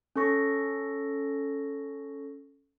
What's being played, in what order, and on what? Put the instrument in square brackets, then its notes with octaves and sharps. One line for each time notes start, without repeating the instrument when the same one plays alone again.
[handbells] C#4 A4 C#6 A#6